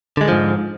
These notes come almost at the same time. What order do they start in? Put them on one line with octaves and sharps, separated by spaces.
D3 G#3 D#3 F3 G#2